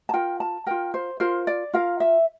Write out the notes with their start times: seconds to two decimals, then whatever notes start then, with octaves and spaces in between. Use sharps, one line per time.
0.09 A5
0.13 F4 A#4 G5
0.40 A5
0.66 F4 A#4 G5
0.94 C5
1.20 F4 A#4 C5
1.47 D5
1.73 F4 A#4 F5
2.00 E5